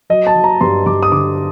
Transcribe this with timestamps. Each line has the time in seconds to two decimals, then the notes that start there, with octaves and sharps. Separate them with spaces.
0.10 F#3 D#5
0.27 A5
0.36 F#3
0.44 A#5
0.61 G2 C6
0.86 G2 D6
1.03 D#6
1.12 D3 D6